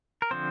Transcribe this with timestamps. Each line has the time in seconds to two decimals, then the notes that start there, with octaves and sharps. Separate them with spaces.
0.22 A#4
0.31 D3 F3 C4 C5